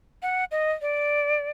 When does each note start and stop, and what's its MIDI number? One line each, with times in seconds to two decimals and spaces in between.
0.22 0.45 78
0.51 0.72 75
0.81 1.50 74